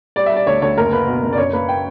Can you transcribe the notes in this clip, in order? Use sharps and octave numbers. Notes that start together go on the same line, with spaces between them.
G3 D5
E5
G3
D5
D2 C#5
D2 C#5
F#1 A#4
A#3 B4
B2
F#1
D5
F#2 C#5
A#3 B4
G5